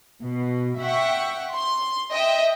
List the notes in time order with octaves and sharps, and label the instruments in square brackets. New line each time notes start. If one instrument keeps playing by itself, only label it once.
[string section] B2
E5 F#5 G5 C#6
C6
D#5 E5 G5